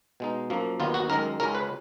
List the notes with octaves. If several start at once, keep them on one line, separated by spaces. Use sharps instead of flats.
B2 G#3 D#4
F#2 F3 A#3
D#2 D#3 F#3 B3 F4
F#4
F#2 D#3 G#3 A#4
C#2 C#3 G#3 C#4 A#4
B4